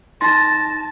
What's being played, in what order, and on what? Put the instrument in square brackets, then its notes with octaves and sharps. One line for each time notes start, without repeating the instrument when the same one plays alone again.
[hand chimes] D#4 A6 A#6 [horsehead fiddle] A5 [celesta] C6